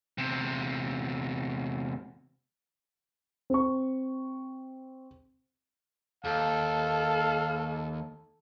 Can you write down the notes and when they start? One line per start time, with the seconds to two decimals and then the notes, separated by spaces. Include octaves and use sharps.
0.18 E2 C3
3.50 C4 C#6
6.25 D#2 A4 F5